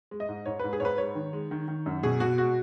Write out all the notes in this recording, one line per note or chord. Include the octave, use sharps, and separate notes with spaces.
G#3
D#5
G#2
G#2 C#5
G#2 B4
G#4
G#2 B4 C#5
G#3 C#5
D#3
G#3
D#3
D#3
F#2
B2 G#4
B2 F#4
G#3 F#4